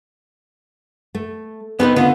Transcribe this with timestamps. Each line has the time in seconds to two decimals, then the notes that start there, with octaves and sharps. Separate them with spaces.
1.15 A3
1.80 B3 C4 D#4 B4
1.96 D3 A3 B3 F4